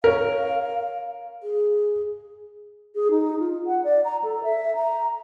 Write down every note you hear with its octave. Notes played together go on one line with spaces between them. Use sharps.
A#4 C#5 F5
G#4
G#4
D#4
F4
F#5
D5
A#5
A4
E5
A#5